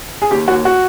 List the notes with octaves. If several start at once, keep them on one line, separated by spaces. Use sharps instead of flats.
G#4
D#2 G4
D#2 F#4
F#4